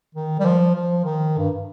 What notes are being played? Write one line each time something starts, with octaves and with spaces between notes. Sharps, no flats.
D#3
G3
F3
F3
D#3
G2